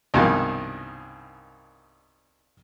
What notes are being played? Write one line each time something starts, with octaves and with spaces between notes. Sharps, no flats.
C2 G2 B2 D#3 G#3 A#3